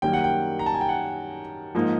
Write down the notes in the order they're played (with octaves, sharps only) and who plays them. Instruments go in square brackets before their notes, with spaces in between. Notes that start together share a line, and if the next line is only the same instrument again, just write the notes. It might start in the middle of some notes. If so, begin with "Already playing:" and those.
[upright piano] F#2 D#3 G3 A#3 [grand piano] G5
[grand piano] F#5
G5
A#5
A5
G#5
G5
F#5
[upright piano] G#2 F3 A#3 D#4